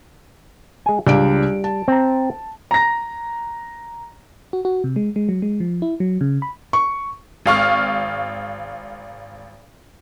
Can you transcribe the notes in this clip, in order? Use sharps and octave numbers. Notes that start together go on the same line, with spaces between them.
G#3 G#5
C#2 G3 D4 D7
A5
C4 A#5
A#5 A#6
F#4
F#4
C3
G#3
G#3
F#3
G#3
F3
E4
F#3
C#3
B5
C#6
G#1 F5 C#6 F6